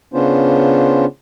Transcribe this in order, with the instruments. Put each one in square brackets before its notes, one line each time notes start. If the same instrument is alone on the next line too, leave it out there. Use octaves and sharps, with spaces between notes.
[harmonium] C#3 B3 C#4 D4 F4 C5